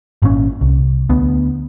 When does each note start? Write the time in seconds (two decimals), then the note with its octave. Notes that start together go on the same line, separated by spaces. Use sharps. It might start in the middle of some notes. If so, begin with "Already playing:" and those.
0.22 G#1 A#2 D#3 C#4
0.61 C2
1.09 D2 B3